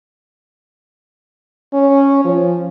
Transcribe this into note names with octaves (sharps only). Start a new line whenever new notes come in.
C#4
F3